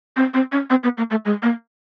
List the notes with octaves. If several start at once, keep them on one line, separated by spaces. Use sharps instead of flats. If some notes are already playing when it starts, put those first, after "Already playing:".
C4
C4
C#4
C4
B3
A#3
A3
G#3
A#3